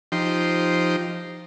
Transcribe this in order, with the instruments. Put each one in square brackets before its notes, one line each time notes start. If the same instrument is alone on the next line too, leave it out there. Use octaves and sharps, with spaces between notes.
[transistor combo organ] F3 D#4 G4 C5